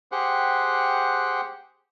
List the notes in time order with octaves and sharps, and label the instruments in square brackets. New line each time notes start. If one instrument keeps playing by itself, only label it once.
[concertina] G4 G#4 C5 F#5 G5 F#6